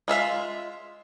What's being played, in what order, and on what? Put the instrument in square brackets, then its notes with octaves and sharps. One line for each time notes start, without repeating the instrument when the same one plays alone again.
[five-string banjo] G#3 F4 E5 F5